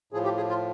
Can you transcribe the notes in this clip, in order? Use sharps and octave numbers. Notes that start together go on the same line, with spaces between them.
A2 F3 G#4
G4
G#4
F4